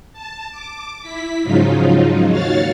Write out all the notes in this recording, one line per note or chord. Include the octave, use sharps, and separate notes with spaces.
A5
D6
E4 B6
G#2 C#3 F3 F#3 D#4 F4
D#2 F#4 C#5 F5 F6 A6